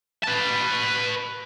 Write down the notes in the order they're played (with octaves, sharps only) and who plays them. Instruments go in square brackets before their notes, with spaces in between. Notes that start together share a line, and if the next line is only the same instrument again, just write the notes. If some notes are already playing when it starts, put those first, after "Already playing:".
[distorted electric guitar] B4 A5